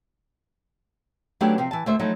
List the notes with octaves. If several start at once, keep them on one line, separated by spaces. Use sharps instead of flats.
F#3 A3 B3 C#4 D4 G4
C3 F3 C4
E3 A5
D2 D3 A3 C5 E5
F3 F#3 A3 D#4 E4